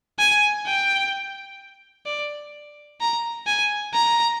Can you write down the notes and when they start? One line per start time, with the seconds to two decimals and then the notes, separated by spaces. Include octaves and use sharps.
0.19 G#5
0.66 G5
2.06 D5
3.01 A#5
3.47 G#5
3.93 A#5